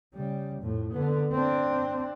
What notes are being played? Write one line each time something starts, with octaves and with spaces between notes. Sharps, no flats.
C#3 G3
F2 A2
D3 B3
C4 D4